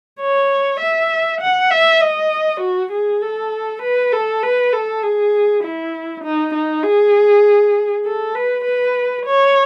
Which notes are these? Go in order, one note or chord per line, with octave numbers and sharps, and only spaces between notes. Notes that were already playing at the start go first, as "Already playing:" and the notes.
C#5
E5
F#5
E5
D#5
F#4
G#4
A4
B4
A4
B4
A4
G#4
E4
D#4
D#4
G#4
A4
B4
B4
C#5